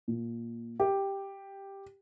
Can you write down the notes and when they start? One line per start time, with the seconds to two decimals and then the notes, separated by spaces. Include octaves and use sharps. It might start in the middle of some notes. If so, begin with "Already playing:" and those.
0.08 A#2
0.80 G4